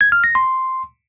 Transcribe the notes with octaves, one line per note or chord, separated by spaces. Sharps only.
G#6
F6
A#6
C6